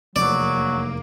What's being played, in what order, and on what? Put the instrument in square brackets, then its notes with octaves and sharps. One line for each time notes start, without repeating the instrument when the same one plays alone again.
[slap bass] F1 E2 [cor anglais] F#3 [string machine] A#3 [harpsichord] D5